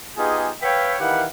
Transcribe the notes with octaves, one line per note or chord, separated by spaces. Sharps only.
B3 D#4 F4 G4 G#4
B4 C#5 E5 F5 G5
D#3 E3 G4 F5 F#5 B5